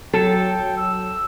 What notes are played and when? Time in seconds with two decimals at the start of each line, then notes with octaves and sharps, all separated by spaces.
0.14 F#3 A4 G5
0.77 E6